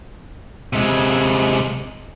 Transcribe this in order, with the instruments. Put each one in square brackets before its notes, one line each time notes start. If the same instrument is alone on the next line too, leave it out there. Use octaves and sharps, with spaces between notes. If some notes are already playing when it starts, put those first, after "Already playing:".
[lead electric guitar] C3 G#3